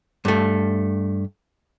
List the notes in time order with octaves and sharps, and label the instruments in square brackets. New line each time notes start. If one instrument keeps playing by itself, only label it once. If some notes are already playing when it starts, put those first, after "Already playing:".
[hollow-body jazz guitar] G2 A3